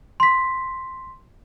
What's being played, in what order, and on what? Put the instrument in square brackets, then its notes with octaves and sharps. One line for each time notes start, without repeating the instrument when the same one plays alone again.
[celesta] C6 B6